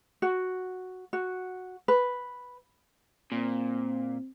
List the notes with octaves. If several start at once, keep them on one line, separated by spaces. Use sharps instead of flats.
F#4
F#4
B4
A#2 C4